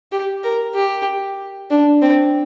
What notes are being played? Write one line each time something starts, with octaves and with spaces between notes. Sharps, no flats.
G4
A#4
G4
D4
C4